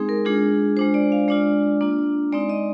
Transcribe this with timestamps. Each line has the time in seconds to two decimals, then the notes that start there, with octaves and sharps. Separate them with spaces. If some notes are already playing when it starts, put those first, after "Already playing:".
Already playing: G#3 C4 D#4 G#4
0.09 A#4
0.25 G#3 D4 F4 G#4
0.76 G#3 D4 F4 C5
0.94 D5
1.12 F5
1.28 G#3 D4 F4 D5
1.81 A#3 D4 F4
2.32 G#3 C4 D#4 D5
2.49 D#5